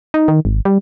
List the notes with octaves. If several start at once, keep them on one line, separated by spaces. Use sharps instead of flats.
D#4
D#3
G#1
G3